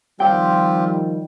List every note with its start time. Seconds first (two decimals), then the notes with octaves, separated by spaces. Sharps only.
0.20 D#3 F3 G3 C4 F4 G4 G5